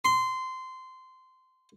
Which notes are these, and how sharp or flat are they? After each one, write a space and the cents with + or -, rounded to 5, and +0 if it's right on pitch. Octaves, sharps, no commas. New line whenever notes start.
C6 -15